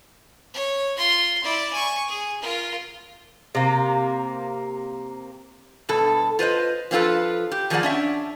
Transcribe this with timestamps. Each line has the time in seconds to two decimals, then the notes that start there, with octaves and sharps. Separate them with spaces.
0.54 C#5
0.97 F4 C6
1.43 E4 D5
1.73 G#5 C#6
2.08 G#4
2.42 F4 A#4
3.55 C3 A#3
5.89 G2 B2 A4
6.39 F4 B4 C5 D#5
6.91 F3 A#3 C4 F4 A4 B4
7.52 G4
7.70 D#3 F3 A#3 G#4 D5 F#5
7.83 C#4 D4 E5